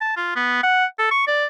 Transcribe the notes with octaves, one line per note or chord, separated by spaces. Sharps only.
A5
F4
B3
F#5
A4
C#6
D5